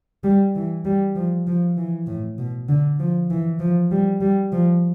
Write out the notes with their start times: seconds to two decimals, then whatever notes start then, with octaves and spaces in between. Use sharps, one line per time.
0.24 G3
0.55 E3
0.85 G3
1.16 F3
1.47 F3
1.77 E3
2.07 A2
2.38 B2
2.69 D3
2.99 F3
3.30 E3
3.60 F3
3.91 G3
4.21 G3
4.52 F3